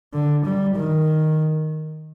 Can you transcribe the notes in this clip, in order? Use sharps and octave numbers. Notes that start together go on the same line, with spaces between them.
D3
G3
D#3